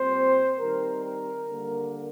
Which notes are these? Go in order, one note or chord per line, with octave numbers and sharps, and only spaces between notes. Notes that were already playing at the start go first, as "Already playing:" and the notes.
Already playing: A#2 G3 C4 C5
D#3 G3 C4 A#4
A#4
D3 G3 A#3